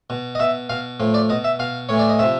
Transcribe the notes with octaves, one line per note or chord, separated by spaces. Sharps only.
B2
D#5
B2 E5
B2 F5
A2 F3
D5
B2 D#5
E5
B2 F5
A2 E3 C#5
D5
D#5
C3 F3 E5